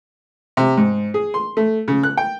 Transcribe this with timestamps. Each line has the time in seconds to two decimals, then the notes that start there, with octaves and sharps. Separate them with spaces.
0.57 C3
0.77 G#2
1.14 G#4
1.34 C6
1.57 A3
1.88 C#3
2.03 F#6
2.17 G5